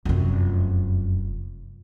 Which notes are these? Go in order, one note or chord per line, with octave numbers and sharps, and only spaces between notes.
F1 F#2